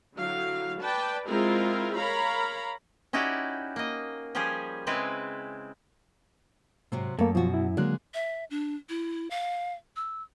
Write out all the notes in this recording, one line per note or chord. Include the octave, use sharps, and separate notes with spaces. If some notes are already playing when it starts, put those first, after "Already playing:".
D3 F#3 E4 F5
B4 D5 G5 A5
G#3 C4 E4 F4 G#4 A#4
A#4 C#5 F5 A#5 B5
C#4 D#4 E4 F#4 G4 D5
A#3 D#5
F3 G3 C#4 G4 G#4
C#3 G#3 C4 E4 B4 G#5
G#2 C3 F#3 C4
F#2 A3 A#3 A4
B2 F3 F4 F#4
E4
D3 F#3 G#3 A#3 F#6
E5
D4
E4
F5
E6